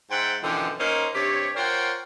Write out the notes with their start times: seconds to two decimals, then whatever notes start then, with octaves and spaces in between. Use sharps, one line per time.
0.11 G#2 C5 E5 F#5 G5
0.43 F#2 B2 D3 E3 F3 G5
0.79 A#3 C#4 D#4 A#4 C5
1.15 G2 C3 G4 C#5
1.56 F4 A#4 C5 C#5 F#5 G5